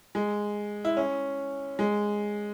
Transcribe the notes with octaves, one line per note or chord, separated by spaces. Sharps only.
G#3
E4
C#4
G#3